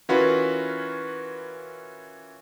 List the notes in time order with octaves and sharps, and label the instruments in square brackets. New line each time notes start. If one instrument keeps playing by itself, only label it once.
[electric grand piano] E3 C#4 F4 F#4 A#4 B4